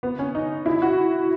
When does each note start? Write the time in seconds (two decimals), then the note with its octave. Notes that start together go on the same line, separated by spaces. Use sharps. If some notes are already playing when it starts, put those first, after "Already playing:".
0.03 B3
0.19 C#4
0.35 D#4
0.66 E4
0.82 F#4